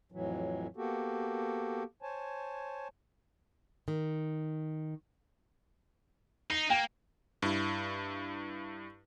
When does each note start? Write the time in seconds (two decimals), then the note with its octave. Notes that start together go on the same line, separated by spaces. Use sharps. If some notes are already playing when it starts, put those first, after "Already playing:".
0.12 F2 A2 E3 F#3
0.77 A#3 B3 F#4 G4 A4
2.02 C5 C#5 G#5 A5
3.88 D#3
6.50 D#4 C7
6.70 A#3 G5
7.42 G2 E4